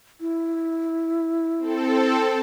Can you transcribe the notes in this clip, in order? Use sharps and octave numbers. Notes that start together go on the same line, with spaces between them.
E4
C4 A4